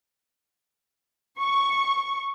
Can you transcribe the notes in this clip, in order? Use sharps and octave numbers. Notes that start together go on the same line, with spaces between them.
C#6